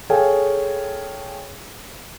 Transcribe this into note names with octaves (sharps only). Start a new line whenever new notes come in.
G#4 A4 C#5 F5 G5 G#5